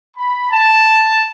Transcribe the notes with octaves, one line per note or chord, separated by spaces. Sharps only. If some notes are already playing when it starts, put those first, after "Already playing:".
B5
A5